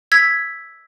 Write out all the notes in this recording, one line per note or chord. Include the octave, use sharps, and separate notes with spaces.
E6 G#6 B6